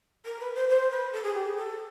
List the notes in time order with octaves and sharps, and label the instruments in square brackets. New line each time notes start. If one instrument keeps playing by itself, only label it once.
[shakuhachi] A#4
B4
C5
C5
B4
A4
G#4
G4
G#4
A4